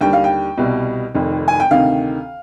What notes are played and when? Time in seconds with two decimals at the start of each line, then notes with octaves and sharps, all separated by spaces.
0.01 D#2 D3 G3 G5
0.13 F5
0.24 G5
0.57 C2 B2 G3
1.14 F1 F2 D#3
1.48 G#5
1.60 G5
1.71 D2 C3 D#3 F5